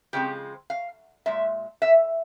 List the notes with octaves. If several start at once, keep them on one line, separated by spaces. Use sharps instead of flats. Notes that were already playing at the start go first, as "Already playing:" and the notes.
C#3 F3 G#3 C4 G4
F5
A#2 G#3 E5
E5